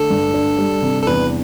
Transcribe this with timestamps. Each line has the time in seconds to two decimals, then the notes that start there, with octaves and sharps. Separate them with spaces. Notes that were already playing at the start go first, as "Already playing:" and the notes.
Already playing: D3 A3 A4
0.10 G2
0.34 D4
0.58 G3
0.82 C3
1.02 A4
1.07 E2 B4